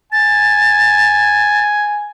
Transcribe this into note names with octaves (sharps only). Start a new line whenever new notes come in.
G#5 A6